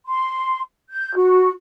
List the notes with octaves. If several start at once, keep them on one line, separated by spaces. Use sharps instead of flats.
C6
G6
F#4